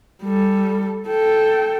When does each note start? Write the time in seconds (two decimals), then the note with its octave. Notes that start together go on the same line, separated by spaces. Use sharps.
0.24 G3 A4
1.08 A4 G5